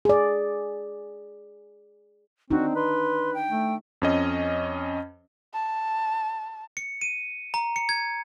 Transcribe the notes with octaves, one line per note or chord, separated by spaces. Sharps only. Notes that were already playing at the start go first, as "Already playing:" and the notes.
G#4 D5
C4 D4 D#4 F#4
B4 C6
G5
A3
F2 C#4 D#5
A5
C#7
D#7
A#5
C#7
G#6